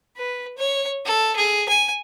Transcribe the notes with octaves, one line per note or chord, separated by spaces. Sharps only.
B4
C#5
A4
G#4
G#5